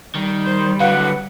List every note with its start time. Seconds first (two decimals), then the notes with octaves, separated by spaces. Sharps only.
0.15 D#3 G3
0.45 C5
0.80 D3 F#3 B4 F5 F#5